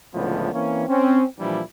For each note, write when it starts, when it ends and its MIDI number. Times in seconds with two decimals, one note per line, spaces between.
0.14 0.50 37
0.14 0.50 45
0.14 0.50 50
0.14 0.50 52
0.14 0.50 53
0.14 0.50 59
0.53 0.84 52
0.53 0.84 58
0.53 0.84 60
0.53 0.84 61
0.89 1.23 60
0.89 1.23 61
1.39 1.60 46
1.39 1.60 52
1.39 1.60 53
1.39 1.60 55
1.39 1.60 62
1.39 1.60 64